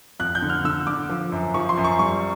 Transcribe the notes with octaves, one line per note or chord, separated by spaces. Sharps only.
F2 F#6
G6
D3
F6
D3 E6
D3 D6
F3
F#2
F3 C#6
C6
F#2
C#6
G3 C#6